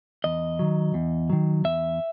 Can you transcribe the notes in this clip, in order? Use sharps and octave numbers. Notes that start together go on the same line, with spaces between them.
E2 D#5
D#3 F#3
E2
D#3 F#3
E2 E5